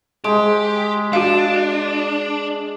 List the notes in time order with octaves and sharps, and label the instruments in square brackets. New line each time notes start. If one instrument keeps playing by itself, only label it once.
[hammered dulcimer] G#3 [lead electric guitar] G4
[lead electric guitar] D4 [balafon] F#4 F5